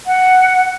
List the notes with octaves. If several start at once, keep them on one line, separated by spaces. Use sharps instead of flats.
F#5